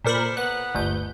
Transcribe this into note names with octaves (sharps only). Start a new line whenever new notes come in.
A#2 A4 A#4 C5 D5 B5
B3 B4 F#6
G1 D2 G6